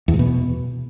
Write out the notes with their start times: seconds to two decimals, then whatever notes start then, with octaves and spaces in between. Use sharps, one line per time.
0.08 E2
0.14 G#2
0.19 B2